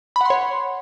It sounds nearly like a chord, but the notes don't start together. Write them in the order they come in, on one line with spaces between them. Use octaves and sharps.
B5 F#5 C6 C#5